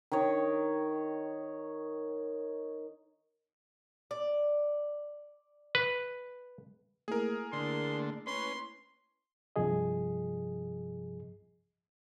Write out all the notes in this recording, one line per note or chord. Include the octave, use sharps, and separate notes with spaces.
D#3 D#4 C#5
D5
B4
A3 A#3 E4 G#4 A#4
D3 C6
C#4 B4 C6
C2 G2 C3 F3 G#4 D#5